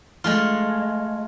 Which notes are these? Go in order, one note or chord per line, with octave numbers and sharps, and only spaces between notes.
G#3 A3 F4